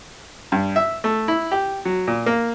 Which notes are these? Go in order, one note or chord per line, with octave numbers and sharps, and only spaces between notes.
G2
E5
A3
E4
G4
F#3
A#2
A#3